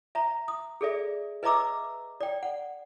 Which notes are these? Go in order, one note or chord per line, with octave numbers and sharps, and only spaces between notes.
E5 A#5
D#6
G#4 A4 D5 E5
B4 D#5 E5 A#5 D6 E6
D5 G5
F#5